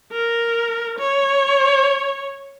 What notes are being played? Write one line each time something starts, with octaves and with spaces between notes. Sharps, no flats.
A#4
C#5